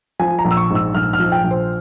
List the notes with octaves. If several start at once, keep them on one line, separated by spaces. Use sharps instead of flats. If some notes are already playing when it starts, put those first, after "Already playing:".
F3 G#5
A#5
A#1
E6
C#6
G#2
E6
A#1 F6
F6
F3
G5
A#1
C5